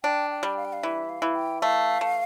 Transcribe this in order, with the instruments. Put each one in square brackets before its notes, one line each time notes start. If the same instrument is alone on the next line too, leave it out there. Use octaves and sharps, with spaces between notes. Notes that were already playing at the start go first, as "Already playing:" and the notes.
[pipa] D4 [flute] G5
[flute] G5
[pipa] G3
[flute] F5
G5
F5
[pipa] E3 [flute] E5
[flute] F5
[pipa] E3
[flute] G5
[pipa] A3 [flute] F5
[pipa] A3